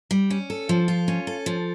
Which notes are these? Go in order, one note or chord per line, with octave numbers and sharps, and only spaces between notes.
G3
C#4
A4
F3
F4
C#4
A4
F3